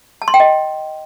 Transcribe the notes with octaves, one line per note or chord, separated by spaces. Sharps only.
A5
C6
G5
D#5